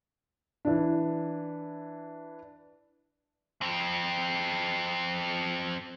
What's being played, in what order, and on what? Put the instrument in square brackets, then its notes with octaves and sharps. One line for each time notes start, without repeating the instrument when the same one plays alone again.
[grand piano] E3 D4
[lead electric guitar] F2 C4